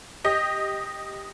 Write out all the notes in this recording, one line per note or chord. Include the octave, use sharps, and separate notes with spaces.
G4 D#5